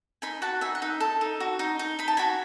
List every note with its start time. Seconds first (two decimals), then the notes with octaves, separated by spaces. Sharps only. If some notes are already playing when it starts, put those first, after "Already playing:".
0.22 D#4 G#5 B5
0.42 F#4 F#5 A5
0.61 D#4 E5 G#5
0.75 F#5
0.82 D#4 E5
1.00 A4
1.21 D#4
1.40 F#4
1.59 D#4
1.79 D#4
1.99 D#4 B5
2.08 A5
2.17 F#4 G#5 B5